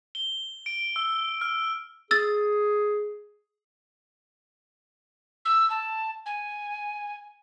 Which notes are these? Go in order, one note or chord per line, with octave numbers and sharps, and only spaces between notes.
G7
D7
E6
F6
G#4 E6 A6
E6
A5
G#5